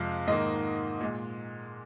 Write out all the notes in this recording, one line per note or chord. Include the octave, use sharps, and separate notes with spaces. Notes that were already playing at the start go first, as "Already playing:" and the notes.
Already playing: F2 C3 F3 G#3 F5
G#2 D#3 A#3 D#5
A#2 G#3